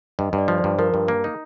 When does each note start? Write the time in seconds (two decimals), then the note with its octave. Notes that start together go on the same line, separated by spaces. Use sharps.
0.19 G2 D#5
0.33 G2
0.38 D5
0.48 F3
0.58 C5
0.64 G2
0.79 F3 A#4
0.94 G2
1.08 A#3
1.24 D#4